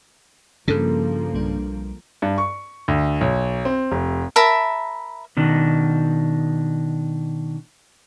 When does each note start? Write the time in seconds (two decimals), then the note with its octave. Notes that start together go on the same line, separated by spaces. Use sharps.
0.68 G2 C#3 F3 A#3 A4
1.34 B1 G3 D4
2.22 G2
2.38 C#6
2.88 D2
3.21 B1
3.65 C4
3.92 F1
4.36 A#4 E5 A5 B5
5.37 B2 D#3 D4